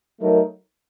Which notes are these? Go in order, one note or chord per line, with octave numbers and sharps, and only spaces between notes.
F#3 A3 D#4 A#4